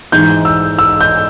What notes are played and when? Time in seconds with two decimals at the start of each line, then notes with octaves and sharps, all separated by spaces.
0.12 G#2 E3 G#3 D#4 G6
0.45 E6
0.79 E6
1.01 G6